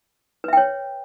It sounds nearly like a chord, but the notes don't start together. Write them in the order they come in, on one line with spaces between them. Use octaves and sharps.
B4 E5 G5 C#5